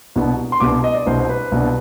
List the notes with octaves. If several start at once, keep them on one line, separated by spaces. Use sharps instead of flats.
C2 B2 B3 D4
C6
C2 B2 B3 D4 D6
D#5
D5
C2 B2 B3 D4 C5
C5
B4
C2 B2 B3 D4